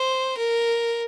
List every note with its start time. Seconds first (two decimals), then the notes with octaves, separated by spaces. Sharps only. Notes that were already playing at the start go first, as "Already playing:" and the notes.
Already playing: C5
0.37 A#4